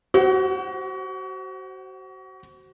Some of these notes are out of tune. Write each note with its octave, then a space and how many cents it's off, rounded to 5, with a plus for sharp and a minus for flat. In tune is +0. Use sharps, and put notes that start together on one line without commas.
F#4 +30 C5 +5 F#5 +0